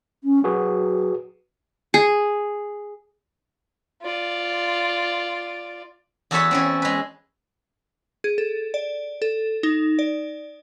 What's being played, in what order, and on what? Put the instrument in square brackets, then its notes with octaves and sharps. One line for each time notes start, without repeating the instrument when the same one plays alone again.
[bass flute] C#4
[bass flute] F#3 [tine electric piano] F#4 G#4 B4
[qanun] G#4
[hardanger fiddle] F4 D5
[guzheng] E2 F#4 A4 B4 C#5 E5
C4 C#4 E4
G#3 B4
[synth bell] G#4
A4
D5
A4
D#4
D5